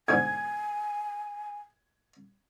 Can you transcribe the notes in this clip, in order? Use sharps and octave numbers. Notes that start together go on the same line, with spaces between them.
B1 G#2 D3 G#5 G#6